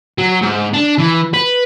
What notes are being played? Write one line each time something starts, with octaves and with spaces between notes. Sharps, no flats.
F#3
G#2
D4
E3
B4